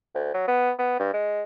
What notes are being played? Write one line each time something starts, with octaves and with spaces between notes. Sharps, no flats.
D2
F#3
B3
B3
G2
G#3